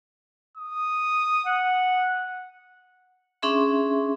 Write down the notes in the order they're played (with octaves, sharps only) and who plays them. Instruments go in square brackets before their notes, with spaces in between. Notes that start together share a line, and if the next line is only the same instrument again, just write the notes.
[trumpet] D#6
[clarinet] F#5
[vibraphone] C#4 D4 G#4 E5 C6